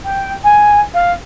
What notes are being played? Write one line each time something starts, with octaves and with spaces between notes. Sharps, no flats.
G5
G#5
F5